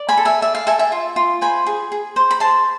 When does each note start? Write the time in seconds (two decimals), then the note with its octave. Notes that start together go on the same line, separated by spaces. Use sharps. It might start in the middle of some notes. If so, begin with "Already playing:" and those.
Already playing: D5
0.09 G#5 B5
0.17 A4
0.25 E5 G#5
0.42 D5 E5
0.55 F5
0.67 A4 E5 G#5
0.79 E5 G#5
0.92 F4
1.16 F4
1.41 C5 G#5 B5
1.67 G#4
1.92 G#4
2.16 C5
2.31 B5
2.40 C5 A5 C6